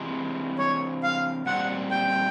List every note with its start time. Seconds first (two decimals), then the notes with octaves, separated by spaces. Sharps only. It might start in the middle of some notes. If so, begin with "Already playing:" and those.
Already playing: C3 E3 G#3 C4
0.58 C#5
1.03 F5
1.46 A#2 G3 C4 F4 F#5
1.91 G5